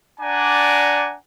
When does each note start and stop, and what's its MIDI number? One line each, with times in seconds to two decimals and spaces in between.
0.20 1.15 62
0.20 1.15 74
0.20 1.15 78
0.20 1.15 80
0.20 1.15 82